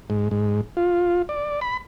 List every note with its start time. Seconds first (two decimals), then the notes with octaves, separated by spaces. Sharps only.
0.10 G#2
0.31 G#2
0.77 F4
1.29 D5
1.61 B5